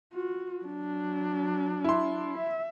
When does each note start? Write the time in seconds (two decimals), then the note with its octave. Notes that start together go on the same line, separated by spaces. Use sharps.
0.13 F4 F#4
0.65 F#3 D4
1.84 E4 C6
2.38 E5